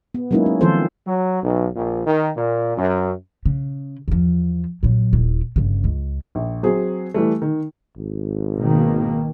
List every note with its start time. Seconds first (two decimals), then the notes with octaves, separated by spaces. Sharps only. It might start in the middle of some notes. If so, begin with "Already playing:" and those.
0.14 B3
0.31 F#3 G#3 A#3 C#4 D#4 E4
0.46 C#4
0.61 D#3 F3 C4 F4 A4 C5
1.07 F#3
1.44 B1
1.76 A#1
2.07 D#3
2.37 A#2
2.78 F#2
3.46 C#3
4.08 E2 F3
4.83 A#2 F#3
5.13 D#1 E4
5.56 G1 C#3
5.84 C#2
6.35 A#1
6.63 F#3 C4 G#4
7.14 E3 G3 A3
7.42 D#3
7.97 G#1
8.58 B2 D#3 A#3